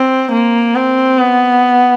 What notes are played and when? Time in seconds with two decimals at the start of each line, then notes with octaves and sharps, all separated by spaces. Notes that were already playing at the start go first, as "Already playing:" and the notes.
Already playing: C4
0.32 A#3
0.76 C4
1.19 B3